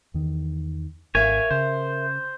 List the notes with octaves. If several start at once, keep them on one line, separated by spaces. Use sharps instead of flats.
E2 D#3
G#1 A#4 C#5 E5 F5 G#5
C#3 C5